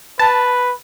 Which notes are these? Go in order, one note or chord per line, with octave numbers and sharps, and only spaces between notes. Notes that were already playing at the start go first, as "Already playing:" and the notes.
B4 A5